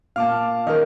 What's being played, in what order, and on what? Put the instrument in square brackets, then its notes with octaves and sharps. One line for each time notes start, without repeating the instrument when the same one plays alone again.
[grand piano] A#2 [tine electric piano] F5 [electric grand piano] A5 D6 F6
[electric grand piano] D#3 C#4 [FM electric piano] A#4 D#5 [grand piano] F6